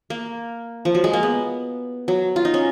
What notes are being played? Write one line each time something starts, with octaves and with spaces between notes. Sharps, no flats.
A#3
F3
F#3
G#3
A#3
B3
F#3
F4
D#4
C#4